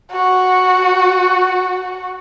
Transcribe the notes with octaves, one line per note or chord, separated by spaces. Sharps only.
F#4